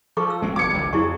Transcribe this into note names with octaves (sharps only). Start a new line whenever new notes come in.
F3 A4 C#6 D6
E6
D#1 G#3 C4
D#1 G#1 F#3 D6 G#6 C#7
G#1 C#2 D3 F#3
F2 F#3 E4 G4 G#4 C#6